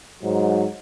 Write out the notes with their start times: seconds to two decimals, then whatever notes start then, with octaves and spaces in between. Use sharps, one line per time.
0.23 G#2 F#3